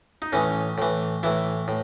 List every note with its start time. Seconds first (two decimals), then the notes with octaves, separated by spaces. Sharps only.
0.22 D#4
0.33 A2 E3 C#4
0.78 A2 E3
1.23 A2 E3 E4
1.68 A2